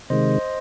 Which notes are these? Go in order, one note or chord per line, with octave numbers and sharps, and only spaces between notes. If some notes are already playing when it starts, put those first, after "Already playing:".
C3 D#3 G#3 C5 D#5